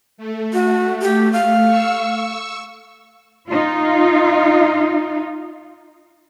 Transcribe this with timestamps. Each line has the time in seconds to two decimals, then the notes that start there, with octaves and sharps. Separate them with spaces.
0.17 A3
0.53 F#4
1.01 G4
1.33 F5
1.67 C#6 E6
3.49 D#4 F4